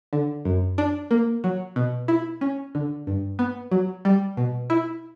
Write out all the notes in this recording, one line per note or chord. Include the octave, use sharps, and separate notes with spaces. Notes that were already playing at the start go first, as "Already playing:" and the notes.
D3
F#2
D4
A#3
F#3
B2
E4
C#4
D3
G2
B3
F#3
G3
B2
E4